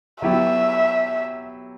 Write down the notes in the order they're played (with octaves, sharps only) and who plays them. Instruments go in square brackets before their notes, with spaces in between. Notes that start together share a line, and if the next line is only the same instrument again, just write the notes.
[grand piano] F#3 B3 E4 G4 [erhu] E5